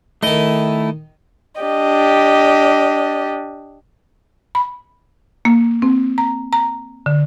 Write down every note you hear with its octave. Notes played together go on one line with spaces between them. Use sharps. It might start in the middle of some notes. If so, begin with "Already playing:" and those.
D#3 A3 E4 D#5
D4 G4 D#5
B5
A#3
C4
A#5
A#5
D3